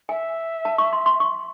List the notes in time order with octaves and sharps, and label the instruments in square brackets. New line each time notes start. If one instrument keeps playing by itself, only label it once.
[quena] E5 [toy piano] G#5
[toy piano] A5
C#6
C6
C6
C#6